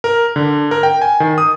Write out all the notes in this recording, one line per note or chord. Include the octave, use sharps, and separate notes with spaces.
A#4
D3
A#4
G5
G#5
D#3
D#6